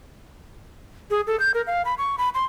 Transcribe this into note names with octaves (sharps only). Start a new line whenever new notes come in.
G#4
A4
G6
A#4
F5
B5
C#6
B5
C6